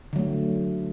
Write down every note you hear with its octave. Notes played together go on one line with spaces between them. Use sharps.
D3 F#3 A3